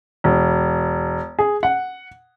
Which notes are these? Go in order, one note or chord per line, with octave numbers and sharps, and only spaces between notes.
E1
G#4
F#5